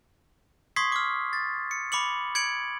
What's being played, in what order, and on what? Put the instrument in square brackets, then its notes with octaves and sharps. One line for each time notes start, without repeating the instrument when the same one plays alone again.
[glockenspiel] C6 C#6 D#6 G#6 B6 C7
D6 F6
A6
C#7
B5 D6 C#7 F#7
G#6 C#7 D7 F#7